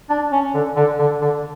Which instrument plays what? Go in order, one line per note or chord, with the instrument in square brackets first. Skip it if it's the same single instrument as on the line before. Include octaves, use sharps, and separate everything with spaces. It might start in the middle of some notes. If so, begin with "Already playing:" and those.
[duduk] D4
C#4
D3
D3
D3
D3